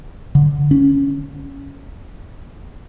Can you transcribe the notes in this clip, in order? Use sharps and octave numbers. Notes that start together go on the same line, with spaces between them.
D3
C#4